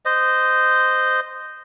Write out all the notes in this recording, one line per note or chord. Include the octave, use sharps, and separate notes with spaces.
C5 D#5